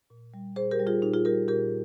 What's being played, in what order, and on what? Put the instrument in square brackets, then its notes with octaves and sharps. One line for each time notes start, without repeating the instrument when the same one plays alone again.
[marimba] A#2
G3
A#2 G#4 C5
G4 A#4
G3
F4 G#4
A#2 D#4 G4
F4 G#4
G3 G4 A#4
A#2 G4 A#4